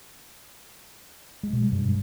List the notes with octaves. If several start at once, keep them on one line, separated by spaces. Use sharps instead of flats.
G#3
B2
G3
G2